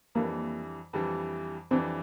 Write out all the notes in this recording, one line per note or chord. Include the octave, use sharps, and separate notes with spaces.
F2 E3 G3 A#3 D4
F2 E3 G3 D4
F2 E3 G3 C4 D4